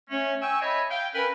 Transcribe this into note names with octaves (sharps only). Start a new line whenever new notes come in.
A3 C#4
G5 G#5 C#6 E6
C#5 D#5 E5 G#5 B5
F5 G5
C#4 A#4 B4